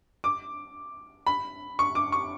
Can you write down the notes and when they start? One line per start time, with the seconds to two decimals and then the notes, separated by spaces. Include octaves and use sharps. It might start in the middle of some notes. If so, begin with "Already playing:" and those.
0.24 D6
1.27 B5
1.79 C#6
1.95 D6
2.12 C#6